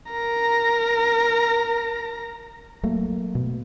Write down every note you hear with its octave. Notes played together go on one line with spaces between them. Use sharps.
A#4 A#5
F#3 A3 A#3
B2